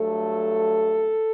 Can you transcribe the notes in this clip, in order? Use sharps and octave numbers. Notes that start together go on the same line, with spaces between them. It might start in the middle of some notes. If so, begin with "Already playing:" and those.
Already playing: G2 F#3 A3 A4